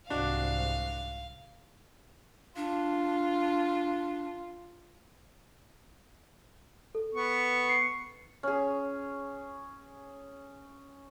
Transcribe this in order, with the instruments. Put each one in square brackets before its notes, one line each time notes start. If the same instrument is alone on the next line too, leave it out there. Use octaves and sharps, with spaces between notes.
[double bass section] C2 G#2 [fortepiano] D4 F#4 [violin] F5
[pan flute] D4 [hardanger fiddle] F4
[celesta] A4
[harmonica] B3 C#6
[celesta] C7 C#7
[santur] C#4 G#4